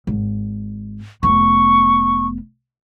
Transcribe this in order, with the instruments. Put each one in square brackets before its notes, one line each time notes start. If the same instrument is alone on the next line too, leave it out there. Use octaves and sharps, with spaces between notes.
[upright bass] G#1
[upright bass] F1 B3 [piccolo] C#6